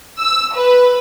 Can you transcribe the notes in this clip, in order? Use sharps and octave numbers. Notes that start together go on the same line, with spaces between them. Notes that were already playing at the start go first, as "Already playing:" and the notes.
E6
B4